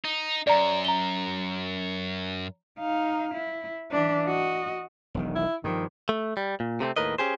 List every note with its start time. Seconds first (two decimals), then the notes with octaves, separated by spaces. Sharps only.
0.05 D#4
0.47 F#2 D5 A#5
0.85 A#5 G7
2.79 D#4 F5
3.34 E4
3.91 E3 D4
4.26 F#4 D#5
5.14 E1 B1 D#3
5.36 E4
5.64 G2 D#3 F3
6.09 A3
6.37 G3
6.60 A#2
6.80 C3 A3 A#3 C4
6.96 D#2 A2 A#4 B4 D#5
7.18 C#4 G4 G#4 C5